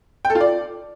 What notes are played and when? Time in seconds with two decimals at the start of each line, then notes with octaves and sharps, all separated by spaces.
0.25 G5
0.30 A4
0.35 F4
0.40 D5